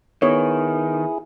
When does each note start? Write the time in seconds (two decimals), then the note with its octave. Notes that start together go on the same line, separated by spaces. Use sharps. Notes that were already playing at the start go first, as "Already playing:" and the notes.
0.22 D#3 B3 E4 G#4 C#5